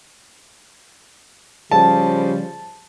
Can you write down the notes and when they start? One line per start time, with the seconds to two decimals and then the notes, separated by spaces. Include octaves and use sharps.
1.71 C#3 F3 G3 A5